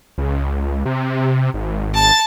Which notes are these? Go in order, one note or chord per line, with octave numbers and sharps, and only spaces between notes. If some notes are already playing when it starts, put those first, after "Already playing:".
C#2
C3
G#1
A5 A6